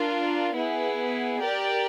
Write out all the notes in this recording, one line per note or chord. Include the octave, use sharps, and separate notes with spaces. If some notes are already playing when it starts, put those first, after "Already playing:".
Already playing: D4 F4 A#4
B3 E4 G#4
G4 A#4 D5